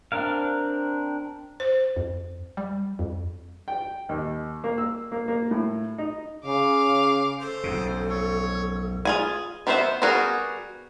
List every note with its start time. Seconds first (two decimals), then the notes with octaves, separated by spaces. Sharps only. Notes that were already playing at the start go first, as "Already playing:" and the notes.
0.12 C4 D4 A#4 F5
1.60 C5
1.96 F2
2.57 G3
2.99 F2
3.68 G5
4.09 D#2
4.64 A#3
4.78 E6
5.12 A#3
5.28 A#3
5.51 A2
5.98 D#4
6.46 C#3 F5 D6
7.40 A4 C5
7.64 B1 F2 C#3
8.09 C#5
9.05 F4 G#4 G#5
9.67 D#3 B3 C4 C5 E5
10.02 G3 B3 F#4 G#4 A#4